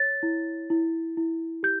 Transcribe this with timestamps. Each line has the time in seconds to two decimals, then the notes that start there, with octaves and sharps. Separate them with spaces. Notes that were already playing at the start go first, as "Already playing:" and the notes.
Already playing: C#5 A6
0.23 E4
0.70 E4
1.17 E4
1.63 G4 G6